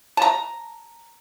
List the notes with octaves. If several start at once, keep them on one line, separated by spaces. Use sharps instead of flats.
A5 A#5